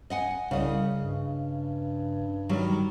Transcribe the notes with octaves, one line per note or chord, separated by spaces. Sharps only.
D#5 F#5 G#5
C2 C#3 D#5
G2
D#3 F#3 G3